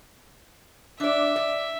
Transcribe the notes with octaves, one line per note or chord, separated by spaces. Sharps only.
D4 D5 E5
D5